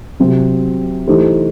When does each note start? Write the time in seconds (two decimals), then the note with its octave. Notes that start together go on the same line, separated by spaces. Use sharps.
0.20 C3 F#3 C4
1.07 E3 A3 D#4 G4 C5